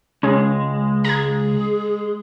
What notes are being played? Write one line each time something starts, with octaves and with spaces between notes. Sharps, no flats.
C#2 G#3 C#4 G#4
G#4 A#5 G#6